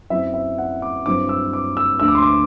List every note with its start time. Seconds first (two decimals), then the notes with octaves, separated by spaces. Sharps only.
0.10 F#2 F#3 C4 E4 E5
0.34 E5
0.58 F#5
0.82 D6
1.05 G2 F#3 C4 E4 D6
1.29 E6
1.53 D6
1.77 E6
2.00 D2 D3 A3 E6
2.08 D6
2.15 C6
2.23 D6